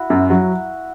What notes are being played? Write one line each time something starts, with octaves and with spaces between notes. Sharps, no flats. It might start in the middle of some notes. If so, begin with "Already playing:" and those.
Already playing: E4 F#4
F#2
F#3